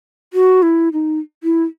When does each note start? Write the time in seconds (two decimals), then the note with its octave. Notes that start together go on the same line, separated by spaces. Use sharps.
0.33 F#4
0.62 E4
0.93 D#4
1.44 E4